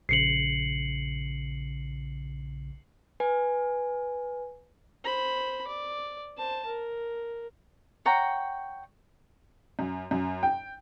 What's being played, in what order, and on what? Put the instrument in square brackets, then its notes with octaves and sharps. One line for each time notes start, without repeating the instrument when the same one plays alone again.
[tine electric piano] A#1 C#3 [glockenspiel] C7 C#7 F#7
[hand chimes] B4 G#5
[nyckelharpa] C5 B5
D5
C5 A5
A#4
[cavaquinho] C#5 F#5 G5 A#5
[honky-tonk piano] F#2
F#2
G5